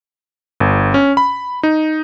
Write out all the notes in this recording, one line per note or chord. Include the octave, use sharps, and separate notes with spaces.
G1
C#4
B5
D#4